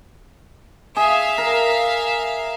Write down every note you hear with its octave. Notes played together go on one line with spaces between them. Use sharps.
G#4 E5 F5
A#4